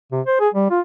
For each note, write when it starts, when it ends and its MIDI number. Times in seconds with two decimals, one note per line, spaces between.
0.12 0.21 48
0.26 0.36 72
0.40 0.49 68
0.54 0.68 55
0.70 0.80 65